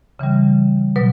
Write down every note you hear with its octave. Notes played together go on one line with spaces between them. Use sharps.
C#3 E3 G3
B2 F#3 B4